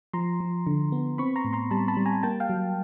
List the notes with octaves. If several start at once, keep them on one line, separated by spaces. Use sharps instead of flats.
F3 A#5 C6
F3
D3
B3
C4 B5 C#6
A#5 C6
A2
A#5 C6
G3 A5 B5
A5 B5
G3
G#5 A#5
A#3 G5 A5
F5 G5
F#3